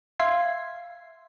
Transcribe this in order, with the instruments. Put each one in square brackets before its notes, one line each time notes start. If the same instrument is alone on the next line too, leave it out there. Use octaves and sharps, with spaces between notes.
[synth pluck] E5 F5 C6 G#6